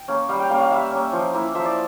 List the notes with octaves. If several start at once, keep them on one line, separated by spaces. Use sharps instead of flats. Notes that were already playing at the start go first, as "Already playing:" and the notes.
Already playing: G5
A#3 C#4
G3 F5
G5
A#3 C#4 F5
F5
G3 E5
A#3 C#4
F3
A#3 E4
F3 E5
D5